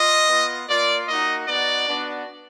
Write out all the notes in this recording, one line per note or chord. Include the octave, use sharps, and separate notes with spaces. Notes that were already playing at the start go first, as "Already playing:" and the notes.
Already playing: F4 D#5
B3 F4
A#3 F4 D5
A#3 D#4 F#4 D#5
B3 D#4 F#4 D5
B3 D4 F#4